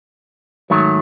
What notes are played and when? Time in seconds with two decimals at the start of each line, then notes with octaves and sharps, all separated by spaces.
0.70 G#2 D#3 F#3 A3